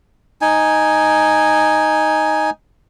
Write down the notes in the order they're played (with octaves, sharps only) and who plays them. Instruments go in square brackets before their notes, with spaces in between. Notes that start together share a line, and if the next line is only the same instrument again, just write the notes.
[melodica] D#4 G#5